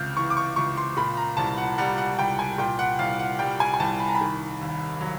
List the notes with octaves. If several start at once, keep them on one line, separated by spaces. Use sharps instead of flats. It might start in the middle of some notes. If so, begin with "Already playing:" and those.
Already playing: C#2 C3 F6 G6
E3 C#6
D6
C#6
C#2 C#6
C6
A#2 B5
A#5
C2 A5
F#5
G3 F#5
F#5
C2 G5
G#5
A#2 G5
F#5
C2 F5
F#5
G3 G5
G#5
G#5
C2 A5
B5
A#5
B5
D#3
D#2
F#3